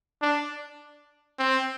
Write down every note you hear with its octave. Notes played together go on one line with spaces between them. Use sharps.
D4
C4